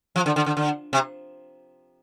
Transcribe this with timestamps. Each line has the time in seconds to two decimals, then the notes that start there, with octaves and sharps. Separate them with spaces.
0.16 F3
0.26 D3
0.36 D3
0.46 D3
0.57 D3
0.93 C3